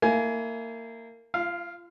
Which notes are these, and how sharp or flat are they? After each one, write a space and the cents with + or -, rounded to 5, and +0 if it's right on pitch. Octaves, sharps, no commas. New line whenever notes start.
A#3 -25 E4 -15 G#5 +20
F4 -35 F5 +0